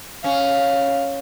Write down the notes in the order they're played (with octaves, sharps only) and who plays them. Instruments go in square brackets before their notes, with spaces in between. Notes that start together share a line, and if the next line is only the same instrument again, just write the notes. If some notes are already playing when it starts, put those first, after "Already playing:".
[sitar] C#4 [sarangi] F5